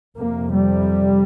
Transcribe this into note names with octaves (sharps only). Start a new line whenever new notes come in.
F2 C3 A#3
G3